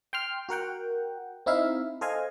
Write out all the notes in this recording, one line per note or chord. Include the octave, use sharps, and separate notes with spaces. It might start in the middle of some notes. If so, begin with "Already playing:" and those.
G5 C6 F6
F#4 A#4 F#5 G5
C4 D#4 E4 E5 F5
A4 C5 D#5 F5 G#5